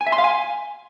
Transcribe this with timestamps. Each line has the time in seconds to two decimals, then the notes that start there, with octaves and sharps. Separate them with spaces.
0.01 G#5
0.07 E5
0.12 C6
0.18 F5
0.24 G#5